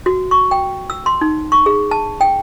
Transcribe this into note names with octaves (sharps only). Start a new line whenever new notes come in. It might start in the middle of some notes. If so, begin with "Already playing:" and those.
F#4
C#6
G5
E6
C6
D#4
C#6
G#4
A5
G5